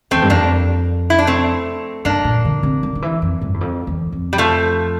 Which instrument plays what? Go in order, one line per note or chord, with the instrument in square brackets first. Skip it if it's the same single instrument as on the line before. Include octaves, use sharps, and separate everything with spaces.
[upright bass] E2 [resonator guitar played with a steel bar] A3 C4
[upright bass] G2
[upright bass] F2 [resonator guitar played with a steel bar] A#3 D4
[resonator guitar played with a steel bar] E4
D4
A3 C4
[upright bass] G2 [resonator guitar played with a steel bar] A#3 D4
[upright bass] A#2
D3
C3
D3
D3
E3
F2
G2
E2
F2
E2
F2
[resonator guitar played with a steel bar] G3
F3 A3